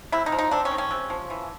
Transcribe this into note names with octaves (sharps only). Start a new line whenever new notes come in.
C3 E4
D#4
F3
D#4
C4 D4
C#4
D#3
C#4
C3
F3
E3